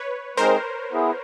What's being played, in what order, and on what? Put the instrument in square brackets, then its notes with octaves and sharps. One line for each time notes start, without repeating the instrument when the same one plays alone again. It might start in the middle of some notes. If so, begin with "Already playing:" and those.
Already playing: [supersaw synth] B4 C#5
[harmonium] G#3 C4 D#4 G#4 [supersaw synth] A#4 C5
[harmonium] B3 E4 G#4